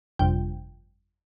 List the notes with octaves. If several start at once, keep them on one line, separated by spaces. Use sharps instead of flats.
G1 F2 C3 G5